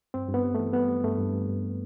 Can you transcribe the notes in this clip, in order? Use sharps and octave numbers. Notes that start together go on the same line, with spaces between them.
G2 C4
G2
B3
G3
E3 A3
G3 B3
G3
G2 A3
G2
G2
G2